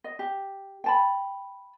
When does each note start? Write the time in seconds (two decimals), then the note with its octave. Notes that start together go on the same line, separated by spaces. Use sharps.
0.04 D#5
0.19 G4
0.84 G5 A5 B5